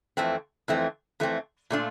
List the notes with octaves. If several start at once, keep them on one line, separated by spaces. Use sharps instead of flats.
F2 E3 A3 C4
F2 E3 A3 C4
F2 E3 A3 C4
A#2 A3 D4 F4